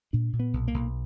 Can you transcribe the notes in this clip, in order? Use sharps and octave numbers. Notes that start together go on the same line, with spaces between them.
A#2 D4
A#2
B3
B1
A#3
B1